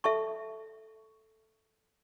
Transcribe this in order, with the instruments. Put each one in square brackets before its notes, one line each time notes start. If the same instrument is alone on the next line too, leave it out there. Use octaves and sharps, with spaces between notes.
[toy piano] A4 E5 A5 C#6